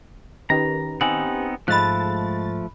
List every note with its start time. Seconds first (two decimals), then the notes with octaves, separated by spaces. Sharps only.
0.50 D#3 C#4 G4 B4 A#5
1.01 B3 C4 D#4 G#5 F#7
1.68 G#2 F3 G#3 A3 B5 F#6 A6